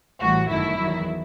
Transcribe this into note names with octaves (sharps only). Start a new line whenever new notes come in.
A1 A2 E3 G3 F#4
G1 F#2 D#3 A3 E4
E2 D#3 F#3